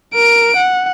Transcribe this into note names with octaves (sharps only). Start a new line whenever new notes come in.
A#4 D7
F#5